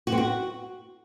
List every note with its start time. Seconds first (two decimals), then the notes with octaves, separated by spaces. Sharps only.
0.07 F#4
0.12 C4
0.18 F#4